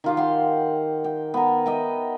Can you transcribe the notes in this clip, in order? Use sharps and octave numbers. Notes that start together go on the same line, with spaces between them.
D#3 F4 G4
G4 F#5 G5 C6
G5
B3 A#4
D#5 E5 G5